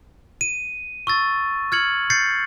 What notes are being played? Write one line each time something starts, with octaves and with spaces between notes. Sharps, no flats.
D#7
C#6 E6 A6
F6 G#6 C#7 F#7
G6 A6 C7 C#7